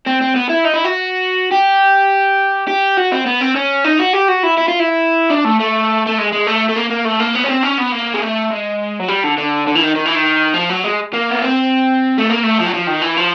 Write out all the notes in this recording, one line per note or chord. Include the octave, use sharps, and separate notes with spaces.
C4
C4
B3
E4
D#4
E4
F#4
G4
G4
F#4
C4
B3
C4
C#4
D#4
F#4
G4
F#4
E4
E4
F4
E4
D4
A3
A3
A3
G#3
G#3
A3
A3
A#3
A#3
A3
A#3
B3
C#4
C4
C#4
B3
A#3
G#3
A3
G#3
F#3
G3
D3
D3
D3
E3
D#3
D#3
E3
D#3
F3
F#3
G#3
A#3
B3
C4
A3
A#3
A3
F3
F#3
F3
D#3
E3
F3